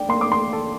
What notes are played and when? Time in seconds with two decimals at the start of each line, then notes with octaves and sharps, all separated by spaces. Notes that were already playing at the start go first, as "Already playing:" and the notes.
Already playing: D4 D5 G5
0.09 A#3 C6
0.21 D6
0.32 C6
0.53 A4